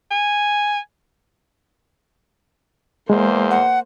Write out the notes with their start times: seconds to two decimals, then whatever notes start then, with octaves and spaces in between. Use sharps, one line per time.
0.11 G#5
3.10 E2 G#3 A#3 C5
3.51 F#5